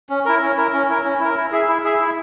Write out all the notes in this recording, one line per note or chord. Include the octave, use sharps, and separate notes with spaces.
C#4
E4 A#4
C#4
E4 A#4
C#4
E4 A#4
C#4
E4 A#4
E4
G#4 E5
E4
G#4 E5
E4